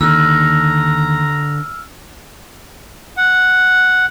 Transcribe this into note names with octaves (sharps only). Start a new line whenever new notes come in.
D#2 D3 A#5 E6 F6
F#5